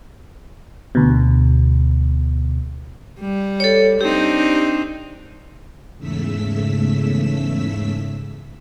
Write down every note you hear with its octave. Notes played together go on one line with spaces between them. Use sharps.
D2 B2
G3
A4 C#5
C4 D4 D#4 G4
E2 G#2 C#3 A3 E6 B6